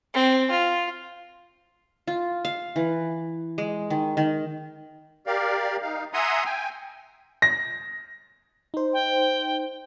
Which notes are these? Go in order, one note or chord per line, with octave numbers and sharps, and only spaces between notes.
C4
F4
F4
F5
E3
G#3
D#3
D#3
G4 A#4 D5 F5
D#4 F5
E5 F#5 G#5 A#5 C6 D#6
G5 G#5
A#6
D#4 C5
G5